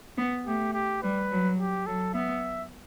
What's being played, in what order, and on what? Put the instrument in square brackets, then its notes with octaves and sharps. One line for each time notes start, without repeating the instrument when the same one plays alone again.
[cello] B3
[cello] A3 [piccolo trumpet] G4
[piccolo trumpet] G4
[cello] G3 [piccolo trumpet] B4
[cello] F#3
[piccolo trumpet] G4
[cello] F#3 [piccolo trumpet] A4
[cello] B3 [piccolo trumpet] E5